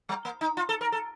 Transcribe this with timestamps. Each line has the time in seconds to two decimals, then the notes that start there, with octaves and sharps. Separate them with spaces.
0.09 G3
0.25 A#3
0.41 D#4
0.57 F4
0.69 A4
0.81 A#4
0.92 A4